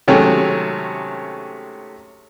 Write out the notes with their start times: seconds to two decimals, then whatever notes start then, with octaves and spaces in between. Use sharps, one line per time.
0.08 C3 D#3 F#3 G#3 A3 C#4